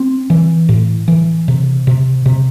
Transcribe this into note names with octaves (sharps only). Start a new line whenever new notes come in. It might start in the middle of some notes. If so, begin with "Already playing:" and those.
Already playing: C4
E3
A2
E3
C3
C3
C3